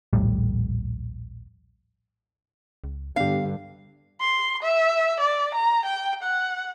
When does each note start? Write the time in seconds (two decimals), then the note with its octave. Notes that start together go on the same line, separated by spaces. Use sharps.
0.13 A#1 D#2 A2 G3
2.84 C#2
3.16 G2 D3 B3 D4 G4 F5
4.21 C6
4.63 E5
5.21 D5
5.55 A#5
5.86 G5
6.23 F#5